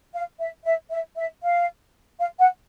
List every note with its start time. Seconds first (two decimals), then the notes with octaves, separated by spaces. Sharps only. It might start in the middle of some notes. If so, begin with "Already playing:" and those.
0.14 F5
0.39 E5
0.65 E5
0.91 E5
1.17 E5
1.43 F5
2.19 F5
2.39 F#5